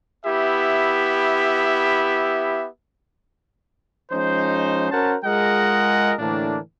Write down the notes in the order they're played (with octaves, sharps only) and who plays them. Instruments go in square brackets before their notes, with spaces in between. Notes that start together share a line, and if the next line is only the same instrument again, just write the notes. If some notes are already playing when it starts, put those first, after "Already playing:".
[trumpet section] B3 E4 G4 E5
[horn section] F3 G#3 C#4 D#4 C5
C#4 F#4 A#4 C5 F#5 A5
G#3 F4 G#4 A#4 D#5 F#5
A2 D3 E3 A#3 D4